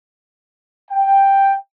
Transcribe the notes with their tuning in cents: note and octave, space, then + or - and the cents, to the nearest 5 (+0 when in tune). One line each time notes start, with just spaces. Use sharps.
G5 +5